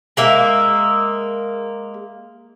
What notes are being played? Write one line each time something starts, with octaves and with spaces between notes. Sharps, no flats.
G#3 A#3 E5